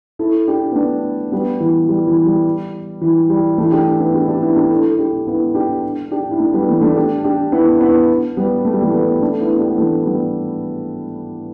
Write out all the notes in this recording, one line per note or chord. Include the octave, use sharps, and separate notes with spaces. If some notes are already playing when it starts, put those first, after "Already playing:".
E4 A4
D4 G4
B3
A3 D4
G3 B3
E3
G3
E3
G3
E3
G3
E3 A3
D4 G4
B3 E4
D4 G4
D4 G4
B3 E4
D4 G4
E4 A4
A4
D4 G4
B3 E4
D4 G4
D4 G4
E4
A3 D4
G3 B3
E3 A3
A3 D4
D4 G4
D4 G4
B3 E4
B3 E4
G3 B3
A3
G3
E3 A3
G3 B3
A3 D4
B3 E4
D4 G4
B3
E3 A3
G3 B3